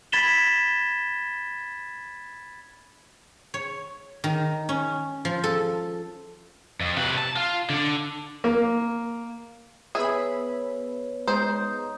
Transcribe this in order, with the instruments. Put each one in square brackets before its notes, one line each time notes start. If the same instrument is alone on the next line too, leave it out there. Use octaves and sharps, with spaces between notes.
[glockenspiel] B5 G#6 A6 B6 E7 G7
[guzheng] C#5
D#3
C#4
F3
A4
[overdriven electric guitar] F2
C3 B4
A5
F4
D3 D4
[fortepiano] A#3
[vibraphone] B3 B4 C#5 [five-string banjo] G#4 [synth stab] E5 B5
[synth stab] G#3 [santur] D#4 [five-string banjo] C5